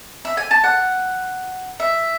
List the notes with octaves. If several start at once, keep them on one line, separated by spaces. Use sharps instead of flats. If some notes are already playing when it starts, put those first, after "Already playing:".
E5
G#5
A5
F#5
E5